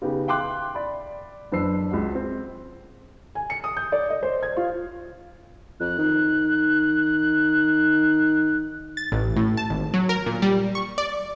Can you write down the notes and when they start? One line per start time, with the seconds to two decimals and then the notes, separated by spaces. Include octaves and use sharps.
0.02 C#3 B3 D#4 G4
0.28 F5 G5 C6 D6 F#6
0.75 D5 B5
1.52 F#1 D4 B4 C5 E6 C7
1.91 C#2 F#4
2.15 C4
3.35 G#5
3.50 C#7
3.64 D#6
3.77 G6
3.92 D5
4.10 D#5
4.23 C5
4.43 G#6
4.57 F4
5.80 F2 F#6
5.98 D#3
8.97 A6
9.12 A1
9.36 A2
9.57 A5
9.70 G#1
9.94 F#3
10.09 A#4
10.26 A#2
10.42 G3
10.75 C#6
10.98 D5